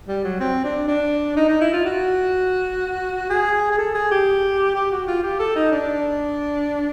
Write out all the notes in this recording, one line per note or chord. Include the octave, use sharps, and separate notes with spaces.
G3
F#3
C4
D4
D4
D#4
D#4
E4
F4
F#4
G#4
G#4
A4
G#4
G4
G4
F#4
F4
G4
A4
D#4
D4